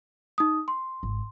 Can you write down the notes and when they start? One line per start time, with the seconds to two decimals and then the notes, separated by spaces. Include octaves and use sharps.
0.38 D#4 D#6
0.68 C6
1.03 G#1